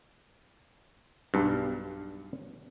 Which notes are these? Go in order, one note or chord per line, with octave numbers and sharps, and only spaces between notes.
B1 G2